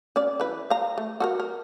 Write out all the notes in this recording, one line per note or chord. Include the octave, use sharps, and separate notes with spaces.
C#4 D5
E3 B4
F5 A#5
A3
F#4 A4 A#4
A#4